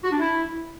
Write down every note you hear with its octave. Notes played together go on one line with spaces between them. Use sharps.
F#4
D4
E4